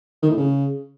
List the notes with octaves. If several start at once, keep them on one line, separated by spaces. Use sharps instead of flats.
D#3
A2
C#3